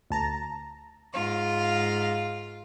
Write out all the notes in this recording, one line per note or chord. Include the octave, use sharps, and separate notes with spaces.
D2 A5 A#5
G#2 F4 F5